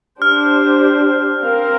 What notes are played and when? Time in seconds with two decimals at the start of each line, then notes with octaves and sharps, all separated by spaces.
0.22 D4 G4 C5 F6
1.42 C4 A#4 F5